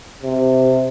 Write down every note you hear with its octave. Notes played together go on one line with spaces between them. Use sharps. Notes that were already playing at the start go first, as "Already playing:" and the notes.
C3